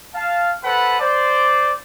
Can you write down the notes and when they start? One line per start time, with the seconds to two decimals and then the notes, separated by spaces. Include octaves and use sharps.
0.15 F5 A5
0.64 A4 B4 C5 F#5 A5 B5
1.00 C5 D5